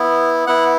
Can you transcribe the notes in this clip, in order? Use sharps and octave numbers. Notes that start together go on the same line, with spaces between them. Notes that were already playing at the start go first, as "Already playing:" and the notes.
Already playing: B3 E4
B3 E4 F#5